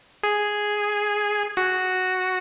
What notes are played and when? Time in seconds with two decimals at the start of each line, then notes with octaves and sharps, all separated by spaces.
0.23 G#4
1.57 F#4